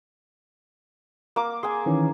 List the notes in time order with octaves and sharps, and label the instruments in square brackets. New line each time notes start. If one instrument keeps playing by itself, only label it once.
[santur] A#3 D6
[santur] G#4 G#5 [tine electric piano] C6
[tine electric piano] D#3 E3 C#4